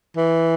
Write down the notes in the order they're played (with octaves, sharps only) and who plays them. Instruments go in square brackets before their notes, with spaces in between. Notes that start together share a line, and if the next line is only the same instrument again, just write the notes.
[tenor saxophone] E3